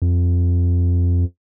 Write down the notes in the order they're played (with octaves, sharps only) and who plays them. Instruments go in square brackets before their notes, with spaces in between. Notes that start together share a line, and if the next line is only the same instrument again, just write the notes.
[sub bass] F2